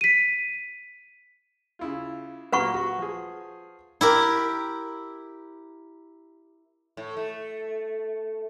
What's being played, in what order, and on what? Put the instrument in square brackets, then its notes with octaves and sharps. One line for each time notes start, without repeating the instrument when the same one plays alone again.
[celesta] B6 D#7
[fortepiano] C#3 E4 F4
[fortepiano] A#2 F#3 A#3 [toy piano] B4 F#5 C#6
[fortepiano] F#4
F3 G#4
[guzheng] E4 G4 A#4
[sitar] A2
A3